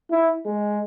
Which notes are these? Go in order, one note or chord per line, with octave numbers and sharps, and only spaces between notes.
E4
G#3